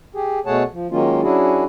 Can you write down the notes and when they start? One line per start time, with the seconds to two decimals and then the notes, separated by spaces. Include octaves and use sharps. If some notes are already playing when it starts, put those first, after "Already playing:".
0.15 G4 G#4
0.46 B2 A3 G#4 C#5 F#5 A5
0.73 F3
0.91 D#3 F#3 G#3 A#3 C#4 F4
1.23 F#3 C#4 D4 E4 F#4 G#4